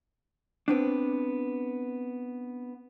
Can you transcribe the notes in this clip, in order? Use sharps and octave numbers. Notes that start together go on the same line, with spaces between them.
B3 C4 D4